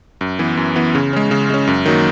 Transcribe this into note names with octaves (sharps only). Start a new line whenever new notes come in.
F#2
E3 B3
F#2
E3 B3
C#3
G#3 C#4
C#3
G#3 C#4
F#2
D#3 F#3 A#3